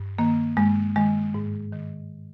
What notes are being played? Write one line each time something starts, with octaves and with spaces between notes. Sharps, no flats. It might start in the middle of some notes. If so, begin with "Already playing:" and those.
Already playing: G2
D#3 A#3
G2 G#3
D#3 G#3
G#2
D#3